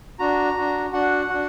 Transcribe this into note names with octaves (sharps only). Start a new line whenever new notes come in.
D4 F#4 A#5
D4 F#4
D4 F#4 F#5
D4 F#4